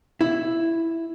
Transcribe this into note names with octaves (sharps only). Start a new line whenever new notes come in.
E4